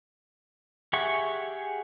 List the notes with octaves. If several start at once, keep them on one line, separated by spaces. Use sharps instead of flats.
G4 G#4 E5 F#5 C#6